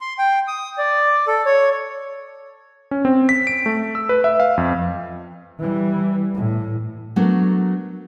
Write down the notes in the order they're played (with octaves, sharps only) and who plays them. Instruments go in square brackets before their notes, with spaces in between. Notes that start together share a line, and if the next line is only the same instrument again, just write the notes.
[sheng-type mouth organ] C6
G5
D#6
D5
A4
C#5
[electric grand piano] C#4
C4
B6
D7
A3
E6
B4
E5
F5
F2
[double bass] E3 G3
A2
[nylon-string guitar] F#3 A3 B3 D4 A#4